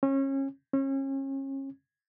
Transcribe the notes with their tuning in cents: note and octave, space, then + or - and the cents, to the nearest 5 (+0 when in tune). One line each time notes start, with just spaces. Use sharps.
C#4 -30
C#4 -35